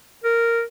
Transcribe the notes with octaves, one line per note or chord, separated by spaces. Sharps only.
A#4